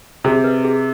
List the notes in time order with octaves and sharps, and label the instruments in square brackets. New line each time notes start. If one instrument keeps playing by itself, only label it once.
[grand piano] C3 [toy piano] G#4
[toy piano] B4 D#5
G#4